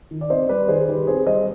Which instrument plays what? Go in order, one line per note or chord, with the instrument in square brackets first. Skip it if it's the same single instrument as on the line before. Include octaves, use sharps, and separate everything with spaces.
[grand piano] D#3
D5
C4 C5 D#5
G3 B4 D5
D#3 G#4 C5
D#3 G4 B4
C4 G#4 C5
G3 C5 D#5